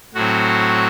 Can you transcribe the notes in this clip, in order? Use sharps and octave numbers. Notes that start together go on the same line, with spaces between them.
A2 F#3 C4 F#4